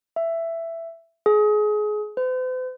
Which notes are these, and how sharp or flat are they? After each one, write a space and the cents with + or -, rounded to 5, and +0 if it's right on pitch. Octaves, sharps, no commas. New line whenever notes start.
E5 +10
G#4 +25
C5 -45